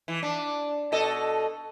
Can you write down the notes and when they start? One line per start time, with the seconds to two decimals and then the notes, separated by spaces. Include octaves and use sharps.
0.08 E3
0.23 D4
0.92 B2 A4 D#5